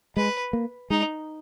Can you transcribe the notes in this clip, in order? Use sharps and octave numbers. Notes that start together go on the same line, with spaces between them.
G#3 B4
A#3
G#3 D#4